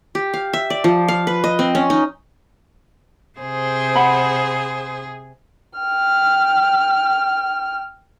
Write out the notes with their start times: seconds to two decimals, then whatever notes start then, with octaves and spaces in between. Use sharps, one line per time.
0.15 G4
0.34 F5
0.53 E5
0.70 D5
0.84 F3
1.08 F5
1.27 B4
1.44 D#5
1.59 C4
1.75 C#4
1.90 D#4
3.40 C3 G#4 C5
3.96 F#5 B5
5.79 G5 F6